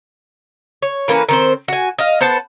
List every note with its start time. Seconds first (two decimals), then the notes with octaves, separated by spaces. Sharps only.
0.82 C#5
1.08 E3 A#3 C#4 B4
1.29 D#3 C4 C5
1.68 F#4 G#5
1.98 D#5 F5
2.21 B3 C5 F#5 A5